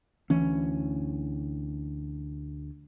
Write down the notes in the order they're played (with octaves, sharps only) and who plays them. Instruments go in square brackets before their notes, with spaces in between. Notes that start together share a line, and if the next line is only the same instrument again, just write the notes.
[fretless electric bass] D2 E3 C#4